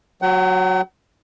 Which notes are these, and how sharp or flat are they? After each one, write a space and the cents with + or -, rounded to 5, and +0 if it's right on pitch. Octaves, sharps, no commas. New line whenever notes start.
F#3 -5 F#5 +40